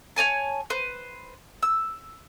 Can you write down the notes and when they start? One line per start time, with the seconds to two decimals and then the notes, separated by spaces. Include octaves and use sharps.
0.16 C#5 D5 G#5 A5
0.70 B4 C5
1.63 E6